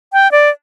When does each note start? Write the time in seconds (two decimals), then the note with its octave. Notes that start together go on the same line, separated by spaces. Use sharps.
0.13 G5
0.32 D5